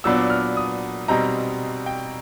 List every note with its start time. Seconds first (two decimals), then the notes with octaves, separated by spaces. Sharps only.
0.04 A#2 F#3 B3 D4 E6
0.30 F6
0.57 D#6
1.08 B2 G3 C4 D#4 A#5
1.86 G5